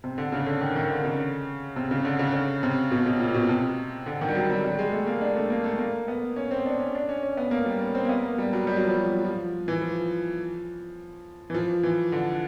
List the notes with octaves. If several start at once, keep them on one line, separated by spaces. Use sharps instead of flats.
C3
D3
C#3
D3
D#3
D#3
D3
C#3
C3
C#3
D3
C#3
C#3
C3
B2
B2
A#2
B2
C3
D3
D#3
G3
F#3
G3
G3
G#3
A3
A#3
D4
A3
A#3
A3
A#3
B3
C#4
C4
D4
C#4
D4
C#4
C#4
B3
A#3
G3
C#4
C4
A#3
B3
A#3
G3
F#3
G3
F#3
F3
F#3
F3
E3
F3
E3
F3
E3
D3